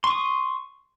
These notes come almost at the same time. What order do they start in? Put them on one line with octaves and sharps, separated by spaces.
C6 C#6 D#6